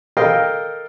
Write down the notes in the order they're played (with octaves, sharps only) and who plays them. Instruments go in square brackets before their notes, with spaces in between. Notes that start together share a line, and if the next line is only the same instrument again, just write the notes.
[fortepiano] A4 A#4 D#5 F5 G5